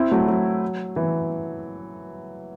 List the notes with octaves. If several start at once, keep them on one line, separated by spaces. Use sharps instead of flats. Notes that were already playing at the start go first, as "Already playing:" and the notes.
Already playing: C4 E4
F#3 A3
F#3
E3